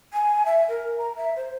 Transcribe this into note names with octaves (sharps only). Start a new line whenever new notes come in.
G#5
E5
A#4
A#5
E5
C5